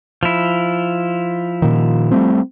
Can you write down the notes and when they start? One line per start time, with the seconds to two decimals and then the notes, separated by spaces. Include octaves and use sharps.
0.23 F3 E4
1.62 A#2 D#3
2.11 G3 A3 C4